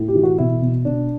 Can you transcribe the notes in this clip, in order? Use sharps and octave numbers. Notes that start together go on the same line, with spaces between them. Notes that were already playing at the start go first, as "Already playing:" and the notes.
Already playing: A2
G4
E3
F#4
B2 E4
B2
B2 D4